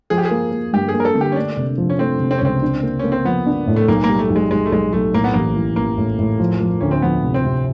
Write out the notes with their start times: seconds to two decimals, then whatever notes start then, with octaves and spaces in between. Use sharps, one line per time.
0.10 F3 G#4
0.18 G4
0.25 G#4
0.31 A#3
0.52 A#3
0.73 G2 G4
0.89 G#4
0.94 A#3
1.00 A#4
1.05 A4
1.15 D3
1.21 G4
1.32 C#4
1.36 A3 D4
1.57 C3
1.78 F3
1.90 C#4
1.99 A3 C4
2.20 C3
2.31 C4
2.38 C#4
2.41 C#2 C4
2.62 D4
2.83 A#3
2.99 A#3 C#4
3.12 C4
3.25 F3 B3
3.46 D4
3.67 A2
3.76 A3
3.88 B1 A#3
4.04 A#3
4.09 G3
4.19 A3
4.30 B1
4.36 G#3
4.51 B1 G#3
4.66 A3
4.72 B1 G#3
4.93 B1 A3
5.13 A2 A#3
5.24 B3
5.34 A1 A#3
5.56 E3
5.76 A1 A#3
5.97 A2
6.19 A2
6.40 F3
6.61 F3
6.80 D2 C#4
6.91 C4
7.02 F3 B3
7.24 C3
7.34 C4
7.45 C3